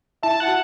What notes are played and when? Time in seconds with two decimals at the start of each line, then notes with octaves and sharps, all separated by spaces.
0.23 E4 E5 A5
0.40 F#5 A5
0.48 F#4